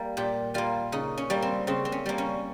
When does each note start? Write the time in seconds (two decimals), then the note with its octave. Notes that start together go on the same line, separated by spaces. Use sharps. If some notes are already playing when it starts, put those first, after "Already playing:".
Already playing: G3 A#3
0.17 A#2 G4
0.54 G3 A#3 F4
0.92 C#3 D#4
1.18 C#4
1.30 G3 A#3
1.42 C4
1.67 C#3 C4
1.85 C4
1.92 C#4
2.06 G3 A#3
2.18 C#4